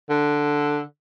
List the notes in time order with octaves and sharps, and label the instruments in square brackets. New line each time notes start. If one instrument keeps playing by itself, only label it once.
[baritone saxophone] D3